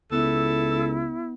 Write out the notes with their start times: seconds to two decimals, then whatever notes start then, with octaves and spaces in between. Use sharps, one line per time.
0.12 C#2 B3 E4 A4